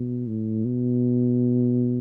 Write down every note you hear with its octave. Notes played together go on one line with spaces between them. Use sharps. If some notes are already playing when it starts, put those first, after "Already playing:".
Already playing: B2
A2
B2